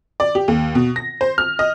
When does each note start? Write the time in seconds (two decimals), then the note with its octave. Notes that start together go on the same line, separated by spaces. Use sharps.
0.20 D5
0.35 G4
0.48 D#2
0.75 B2
0.96 A#6
1.21 C5
1.38 F6
1.59 D#5